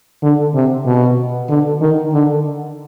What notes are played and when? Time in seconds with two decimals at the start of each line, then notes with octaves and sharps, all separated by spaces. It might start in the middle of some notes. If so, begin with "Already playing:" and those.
0.22 D3
0.54 C3
0.86 B2
1.49 D3
1.81 D#3
2.13 D3